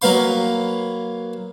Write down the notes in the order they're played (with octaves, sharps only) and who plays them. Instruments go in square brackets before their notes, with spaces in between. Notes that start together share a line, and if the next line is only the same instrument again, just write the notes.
[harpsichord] F#3 A#3 B4 F5 C6